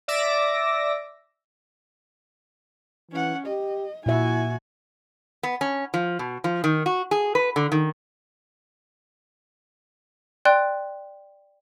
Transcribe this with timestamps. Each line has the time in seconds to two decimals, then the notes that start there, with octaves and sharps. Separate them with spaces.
0.08 D5 E5 D6 E6 A#6
3.11 E3 C#4 F#5
3.46 G4 D#5
4.06 A#2 E4 F#4 E5 G#5
5.43 B3
5.61 C#4
5.94 F3
6.19 B2
6.44 F3
6.64 D#3
6.86 F#4
7.11 G#4
7.35 B4
7.56 D3
7.72 D#3
10.45 D5 G5 C6 F#6